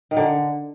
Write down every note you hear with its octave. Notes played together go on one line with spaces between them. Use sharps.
D#3
D3